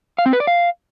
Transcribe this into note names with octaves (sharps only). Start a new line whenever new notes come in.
F5
C4
B4
D5
F5